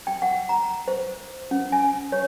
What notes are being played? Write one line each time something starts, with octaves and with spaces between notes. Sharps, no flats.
G5
F#5
A#5
C5
C#4
G#5
C#5